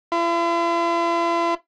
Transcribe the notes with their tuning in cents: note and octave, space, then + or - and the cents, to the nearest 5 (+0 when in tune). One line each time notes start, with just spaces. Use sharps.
E4 +45